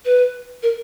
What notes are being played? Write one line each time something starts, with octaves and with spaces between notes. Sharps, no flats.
B4
A#4